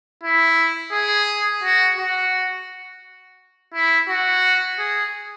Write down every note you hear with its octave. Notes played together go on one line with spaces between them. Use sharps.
E4
G#4
F#4
F#4
E4
F#4
G#4